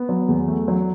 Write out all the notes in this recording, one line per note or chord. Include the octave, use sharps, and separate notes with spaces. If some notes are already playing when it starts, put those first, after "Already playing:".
Already playing: B3
F#3
E2
A3
F#3